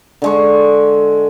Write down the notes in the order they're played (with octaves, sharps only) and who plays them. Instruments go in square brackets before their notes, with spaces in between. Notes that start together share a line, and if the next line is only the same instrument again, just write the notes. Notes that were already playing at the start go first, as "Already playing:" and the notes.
[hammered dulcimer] D3 G#3 C#6